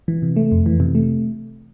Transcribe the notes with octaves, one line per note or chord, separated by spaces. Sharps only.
E3
C3
A3
F2
E3
C3
A3